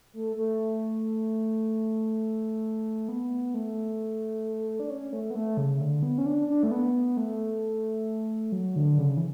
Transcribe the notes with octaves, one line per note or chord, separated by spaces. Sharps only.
A3
A3
B3
A3
D4
C#4
A3
B3
A3
C#3
D3
B3
C#4
D4
D4
A3
B3
A3
F#3
D3
C#3
E3